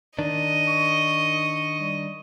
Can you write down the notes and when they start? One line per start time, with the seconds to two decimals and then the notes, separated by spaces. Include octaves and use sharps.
0.19 D#3 D4 D#5
0.67 C#6
1.80 G3